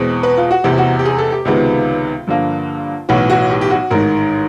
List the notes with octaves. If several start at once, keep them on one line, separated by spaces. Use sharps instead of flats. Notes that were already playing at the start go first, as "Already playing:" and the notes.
Already playing: E2 B2 G#3 C4
B4
F4
F#4
F1 E2 C3 G4
F#4
G4
G#4
A4
G4
C#2 C3 D#3 G#3 B3 F4
G2 D3 F3 A#3
B1 A2 E3 F#4
F#4
G4
G4
F#4
A1 G#2 D#3 A#4